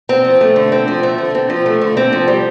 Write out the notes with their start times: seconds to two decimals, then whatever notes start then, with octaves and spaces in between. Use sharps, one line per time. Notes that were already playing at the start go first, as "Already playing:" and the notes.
0.09 C4
0.24 F3
0.41 A3
0.56 D3
0.72 C4
0.88 F3
1.03 A3
1.18 D3
1.35 C4
1.50 F3
1.66 A3
1.82 D3
1.97 C4
2.13 F3
2.28 G3